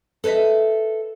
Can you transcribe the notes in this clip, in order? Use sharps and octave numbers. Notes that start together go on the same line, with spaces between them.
A4 B4 C#5 D#5 E5